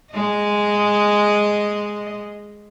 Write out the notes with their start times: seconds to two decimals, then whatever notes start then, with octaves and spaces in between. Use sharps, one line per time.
0.12 G#3 D#5